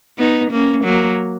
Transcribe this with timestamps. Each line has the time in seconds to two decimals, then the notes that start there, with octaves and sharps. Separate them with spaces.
0.18 B3 D#4
0.51 A#3 C#4
0.84 F#3 A#3